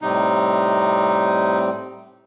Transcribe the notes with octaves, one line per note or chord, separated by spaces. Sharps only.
A2 C3 G3 C4 D#4